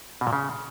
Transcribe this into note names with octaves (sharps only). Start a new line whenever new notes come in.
B2
A#2
C#3